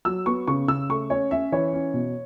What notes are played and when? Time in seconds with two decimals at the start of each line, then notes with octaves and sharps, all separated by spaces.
0.05 F#3 E6
0.26 B3 C#6
0.47 C#3 C#6
0.68 C#3 E6
0.89 A3 C#6
1.10 C#4 C#5
1.31 C#4 E5
1.52 E3 C#5
1.73 C#4
1.93 B2